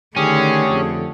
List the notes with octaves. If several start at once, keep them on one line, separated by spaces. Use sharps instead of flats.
D3 D#3 A3 C#4 G4 G#4
F2